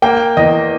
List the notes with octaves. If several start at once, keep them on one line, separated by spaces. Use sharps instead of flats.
A#3 G5
E2 D#5